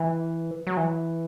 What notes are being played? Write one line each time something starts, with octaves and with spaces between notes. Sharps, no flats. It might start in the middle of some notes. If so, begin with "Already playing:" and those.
Already playing: E3
F#3
E3